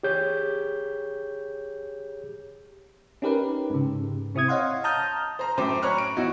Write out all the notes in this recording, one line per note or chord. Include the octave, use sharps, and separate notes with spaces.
G4 G#4 C#5 G6
C#4 D#4 G4 A#4 B4
G#2 C#3
C3 C4 E4 D#6 G#6
C#5 D#5 F5 F#5 C6
A5 A#5 D#6 F6 G6
C5 A#5
F#2 A2 C5 G5 D6
C#5 A#5 B5 C#6 F6 F#6
D7
E2 D#4 E4 F#4